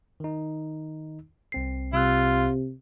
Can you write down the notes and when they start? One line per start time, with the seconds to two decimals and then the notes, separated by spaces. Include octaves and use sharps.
0.20 D#3 D#4
1.52 C2 C4 C7
1.93 C2 C3 F4 E6 F#6